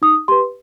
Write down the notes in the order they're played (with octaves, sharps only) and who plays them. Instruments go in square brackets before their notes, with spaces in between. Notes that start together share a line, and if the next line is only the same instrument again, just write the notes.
[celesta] D#4 D#6
G4 B4 C6